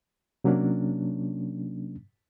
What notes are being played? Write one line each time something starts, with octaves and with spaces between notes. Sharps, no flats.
C3 F#3 A#3 C#4 D4